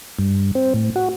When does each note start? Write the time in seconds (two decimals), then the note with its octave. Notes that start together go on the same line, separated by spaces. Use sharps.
0.19 G2
0.55 C4
0.74 A2
0.96 F#4